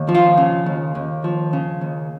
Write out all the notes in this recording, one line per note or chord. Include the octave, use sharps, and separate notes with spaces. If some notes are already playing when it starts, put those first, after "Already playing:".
Already playing: D#2
F3
F4
C#3
D#2
D#2
F3
C#3
D#2